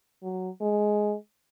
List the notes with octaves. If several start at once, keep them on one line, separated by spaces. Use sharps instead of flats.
F#3
G#3